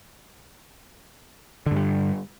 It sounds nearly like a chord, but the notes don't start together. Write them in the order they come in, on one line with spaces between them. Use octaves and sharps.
D3 G2 G3